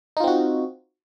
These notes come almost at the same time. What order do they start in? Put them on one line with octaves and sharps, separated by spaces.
D#4 F4 C4 F#4